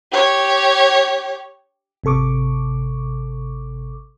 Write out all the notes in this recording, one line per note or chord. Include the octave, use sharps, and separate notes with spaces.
G4 C#5
G#1 C3 A4 C#6 D6